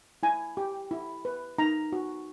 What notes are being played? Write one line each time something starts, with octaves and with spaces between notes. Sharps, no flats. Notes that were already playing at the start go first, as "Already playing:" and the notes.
E4 G#5
G4
E4
B4
D#4 A#5
F#4